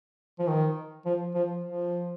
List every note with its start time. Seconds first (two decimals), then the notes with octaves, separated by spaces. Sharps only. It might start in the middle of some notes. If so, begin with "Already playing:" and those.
0.39 F3
0.47 D#3
1.06 F3
1.35 F3
1.64 F3